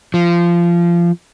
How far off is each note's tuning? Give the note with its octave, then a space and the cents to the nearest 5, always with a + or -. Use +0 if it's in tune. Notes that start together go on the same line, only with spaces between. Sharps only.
F3 -20